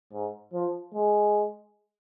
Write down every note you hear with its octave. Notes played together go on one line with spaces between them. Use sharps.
G#2
F3
G#3